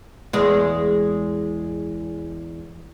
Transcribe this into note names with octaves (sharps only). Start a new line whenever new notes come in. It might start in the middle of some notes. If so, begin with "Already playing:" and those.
E2 G#3